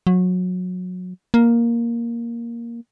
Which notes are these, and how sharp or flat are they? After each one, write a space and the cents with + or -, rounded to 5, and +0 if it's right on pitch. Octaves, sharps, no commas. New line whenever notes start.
F#3 -25
A#3 +5